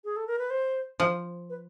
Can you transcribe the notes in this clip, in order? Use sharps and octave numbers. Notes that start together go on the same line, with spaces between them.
G#4
A4
A#4
B4
C5
F3
B4